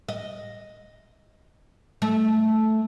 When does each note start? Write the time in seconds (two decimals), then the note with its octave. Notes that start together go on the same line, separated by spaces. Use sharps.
0.09 D#5
2.02 A3